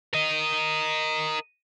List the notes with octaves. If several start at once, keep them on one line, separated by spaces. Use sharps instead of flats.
A#4 D#5